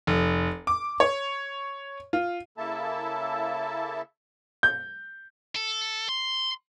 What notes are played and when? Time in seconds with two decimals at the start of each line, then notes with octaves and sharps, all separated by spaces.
0.07 F1
0.67 D6
1.00 C#5
2.13 F4
2.58 C#3 A#3 E4 A4 E5 A5
4.63 G6
5.56 A4
6.09 C6